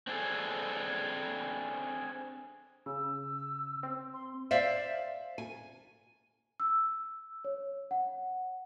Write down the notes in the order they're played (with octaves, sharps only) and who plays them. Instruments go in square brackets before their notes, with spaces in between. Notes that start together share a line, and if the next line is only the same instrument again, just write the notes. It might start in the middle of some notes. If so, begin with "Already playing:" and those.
[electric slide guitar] C4 D4 G#4 A4
[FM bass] C#3 [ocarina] E6
[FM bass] C4
[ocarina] C6
[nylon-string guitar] C5 D5 E5 F5
G#5
[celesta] E6
C#5
F#5